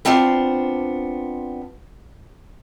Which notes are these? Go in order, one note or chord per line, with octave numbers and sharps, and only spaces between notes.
B3 C4 D4 F4 C5